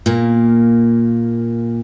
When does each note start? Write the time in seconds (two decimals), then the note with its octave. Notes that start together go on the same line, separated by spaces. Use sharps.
0.06 A#2 A#3